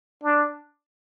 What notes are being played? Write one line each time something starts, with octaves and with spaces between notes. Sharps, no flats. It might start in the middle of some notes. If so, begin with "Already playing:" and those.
D4